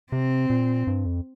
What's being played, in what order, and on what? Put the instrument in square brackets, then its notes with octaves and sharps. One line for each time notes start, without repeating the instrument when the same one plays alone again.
[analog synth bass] C3 [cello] C4
[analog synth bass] A#2
G2
F2